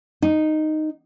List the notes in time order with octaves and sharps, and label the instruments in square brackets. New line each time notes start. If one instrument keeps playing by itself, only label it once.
[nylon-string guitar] D#4